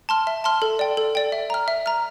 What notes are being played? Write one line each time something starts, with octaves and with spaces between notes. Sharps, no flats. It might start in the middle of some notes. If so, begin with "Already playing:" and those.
A5 C6 F6
E5
A5 C6 F6
A4
D5 G5
A4
D5 G5
E5
A#5 F6
E5
A#5 F6